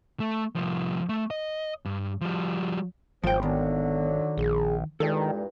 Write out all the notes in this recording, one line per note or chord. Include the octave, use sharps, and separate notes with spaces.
A3
C2 F3
A3
D#5
G2
F3 G3
G#1 F3 C5 G5
D3 D#3 F#3 B3
A#1 G#4
E2 G2 A#2 D#3 G#3 A4